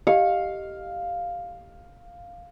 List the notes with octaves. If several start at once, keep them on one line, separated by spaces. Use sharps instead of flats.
G4 D#5 F5 C#7